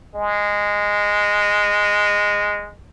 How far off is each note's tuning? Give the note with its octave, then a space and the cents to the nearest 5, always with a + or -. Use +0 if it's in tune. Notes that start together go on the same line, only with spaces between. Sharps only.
G#3 -10